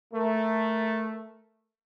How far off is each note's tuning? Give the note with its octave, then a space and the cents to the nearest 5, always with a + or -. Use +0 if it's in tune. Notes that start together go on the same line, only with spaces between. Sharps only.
A3 +0 A#4 +0